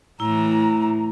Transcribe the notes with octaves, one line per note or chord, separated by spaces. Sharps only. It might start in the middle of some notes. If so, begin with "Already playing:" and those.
A2 E3 E4 A#5